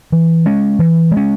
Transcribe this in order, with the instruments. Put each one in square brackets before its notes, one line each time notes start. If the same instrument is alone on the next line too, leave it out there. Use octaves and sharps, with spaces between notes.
[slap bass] E3
G#3 C#4
E3
G#3
C#4